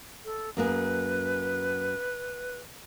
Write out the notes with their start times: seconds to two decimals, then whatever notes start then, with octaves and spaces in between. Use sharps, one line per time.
0.25 A4
0.57 F#2 A#3 G#4 B4